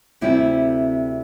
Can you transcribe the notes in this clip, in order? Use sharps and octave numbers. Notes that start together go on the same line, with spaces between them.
D2 C3 G3 C4 E4